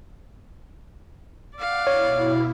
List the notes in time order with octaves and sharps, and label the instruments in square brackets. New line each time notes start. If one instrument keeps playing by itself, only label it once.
[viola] D5 F5 [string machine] F#5
[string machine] B2 E4 [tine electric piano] C#5